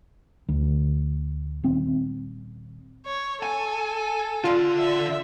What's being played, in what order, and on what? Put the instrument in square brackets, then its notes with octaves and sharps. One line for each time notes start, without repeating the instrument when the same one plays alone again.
[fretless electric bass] D2
D#1 D#2 C4
[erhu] C#5
[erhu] A4 [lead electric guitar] G#5
[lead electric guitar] D3 D5 [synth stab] F4
[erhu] E5